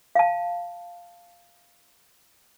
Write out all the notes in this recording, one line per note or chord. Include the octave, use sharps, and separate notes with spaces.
F5 A5